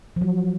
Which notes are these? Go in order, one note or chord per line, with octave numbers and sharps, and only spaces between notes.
F3
F#3